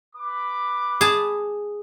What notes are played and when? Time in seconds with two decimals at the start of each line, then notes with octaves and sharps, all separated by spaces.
0.15 B4 D6
1.01 G#4 A5